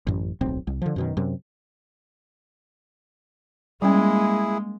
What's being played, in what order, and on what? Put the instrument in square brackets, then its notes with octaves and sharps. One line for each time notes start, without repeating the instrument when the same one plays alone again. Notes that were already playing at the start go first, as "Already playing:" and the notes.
[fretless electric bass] A1 F#2
D1 B1 C4
C2
D3 F3
F#2 B2 D#3
F#2 C3
[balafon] G3 C#4 [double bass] G#3 A#3 [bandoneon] E4 G#4